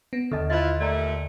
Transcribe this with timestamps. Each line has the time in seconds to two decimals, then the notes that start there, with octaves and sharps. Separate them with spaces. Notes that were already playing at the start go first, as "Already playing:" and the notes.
0.13 B3
0.31 D#2 D3 A4 D#5 A5
0.50 E4 F4 C5 D#5
0.80 A#2 G3 A3 D5 A#5